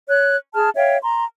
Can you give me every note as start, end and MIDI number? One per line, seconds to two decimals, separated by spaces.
0.08 0.36 73
0.08 0.36 90
0.54 0.69 68
0.54 0.69 81
0.54 0.69 89
0.76 0.97 73
0.76 0.97 76
0.76 0.97 77
0.76 0.97 79
1.02 1.25 82
1.02 1.25 84